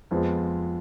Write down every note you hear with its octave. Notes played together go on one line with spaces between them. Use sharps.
F2 F3 G#3 B3 F4